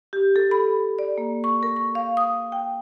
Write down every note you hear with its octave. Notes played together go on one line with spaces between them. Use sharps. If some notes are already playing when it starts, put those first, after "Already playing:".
G4
A4
B5
D5
A#3
C#6
A#4
C#6
F5
D#6
G5